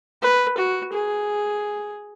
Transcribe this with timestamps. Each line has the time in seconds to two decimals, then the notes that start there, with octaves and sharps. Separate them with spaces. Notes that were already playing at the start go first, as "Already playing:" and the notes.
0.22 B4
0.57 F#4
0.93 G#4